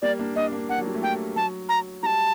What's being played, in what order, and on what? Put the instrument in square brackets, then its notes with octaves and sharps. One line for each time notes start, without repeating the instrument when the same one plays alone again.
[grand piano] G3 A#3 [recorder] D5
[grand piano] A#3 D4
[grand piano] A#3 D4 [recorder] D#5
[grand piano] A#3 D4
[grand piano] A#3 D4 [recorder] F#5
[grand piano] F#3
G3
A3
[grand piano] G3 A#3 [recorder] G5
[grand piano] F#3 [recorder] A5
[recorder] A#5
[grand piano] G3 [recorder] A5 A#5